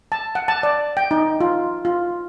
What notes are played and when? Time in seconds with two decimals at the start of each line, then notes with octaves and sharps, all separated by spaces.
0.12 A5
0.35 F#5
0.48 A5
0.63 D5
0.97 G5
1.11 D#4
1.41 F4
1.85 F4